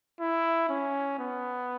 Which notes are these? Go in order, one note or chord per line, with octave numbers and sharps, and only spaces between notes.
E4
C#4
B3